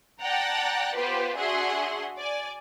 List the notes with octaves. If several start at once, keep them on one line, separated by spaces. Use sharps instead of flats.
D5 F#5 G5 A5 A#5
B3 F4 G4 B4 C5
D4 F#4 G#4 E5 F#5 C6
D5 G#5